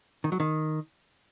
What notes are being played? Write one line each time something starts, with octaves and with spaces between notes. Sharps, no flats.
D#3
F#3
D#3